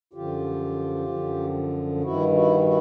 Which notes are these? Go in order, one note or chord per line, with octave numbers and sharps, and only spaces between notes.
F#2 D3 F3 F4 G4
F#2 D3 F3
G2 D#3 E4 F#4
E4 F#4
E4 F#4